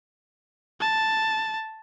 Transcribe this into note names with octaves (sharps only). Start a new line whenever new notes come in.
A5